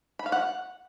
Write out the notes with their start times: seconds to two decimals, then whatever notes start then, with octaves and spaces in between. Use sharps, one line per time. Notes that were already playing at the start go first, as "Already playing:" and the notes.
0.19 B5
0.26 F5
0.32 F#5